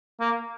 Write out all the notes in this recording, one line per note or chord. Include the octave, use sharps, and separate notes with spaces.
A#3